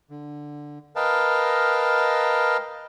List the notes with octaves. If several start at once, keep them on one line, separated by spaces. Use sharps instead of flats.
D3
A#4 B4 D#5 F5 G5 A5